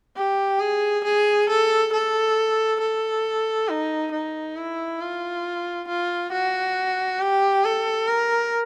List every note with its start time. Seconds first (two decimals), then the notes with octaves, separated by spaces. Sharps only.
0.17 G4
0.60 G#4
1.04 G#4
1.49 A4
1.93 A4
2.80 A4
3.69 D#4
4.12 D#4
4.56 E4
5.01 F4
5.88 F4
6.32 F#4
7.21 G4
7.65 A4
8.08 A#4